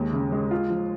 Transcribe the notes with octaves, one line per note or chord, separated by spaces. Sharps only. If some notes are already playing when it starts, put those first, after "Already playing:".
Already playing: D#2 G#3
C#3
G#3
F4
F3